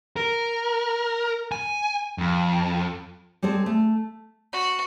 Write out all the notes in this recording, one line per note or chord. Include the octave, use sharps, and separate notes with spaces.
A#4
G#5
F2
G3 G#3 C4 G#4 A4
A3
F#4